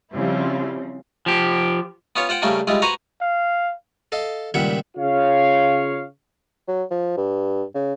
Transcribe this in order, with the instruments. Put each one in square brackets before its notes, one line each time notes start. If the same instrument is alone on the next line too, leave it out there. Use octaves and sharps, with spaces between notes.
[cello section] C#3 F3 C4 [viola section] G3 E4 F4
[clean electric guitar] F3 G4
[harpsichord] B3 C#4 F4 C#5
F4 C5 F#5 G5
C#3 G3 A3 A#3 D4
G3 G#3 E4 F4
F#4 B4 C5 G#5 A#5 C#6
[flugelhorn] F5
[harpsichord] A4 D#5 F5
C#2 A#2 D#3 G3 E5 F#5
[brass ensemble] C#3 F4 C#5 F5
[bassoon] F#3
F3
G2
C#3